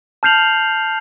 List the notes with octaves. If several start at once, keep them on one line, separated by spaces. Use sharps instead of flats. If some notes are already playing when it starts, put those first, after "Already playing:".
A5 F6 G6 C7 F7 F#7